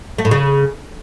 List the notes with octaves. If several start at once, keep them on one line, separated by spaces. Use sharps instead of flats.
A3
A2
C#3